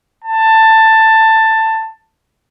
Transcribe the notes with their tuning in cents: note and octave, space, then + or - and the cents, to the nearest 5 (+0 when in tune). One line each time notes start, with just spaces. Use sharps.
A5 +15